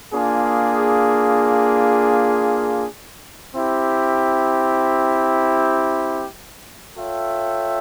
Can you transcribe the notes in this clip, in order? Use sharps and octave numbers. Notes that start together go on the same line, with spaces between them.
A#3 D4 F4 G#4
C4 E4 G4
F4 A4 C#5 E5 G5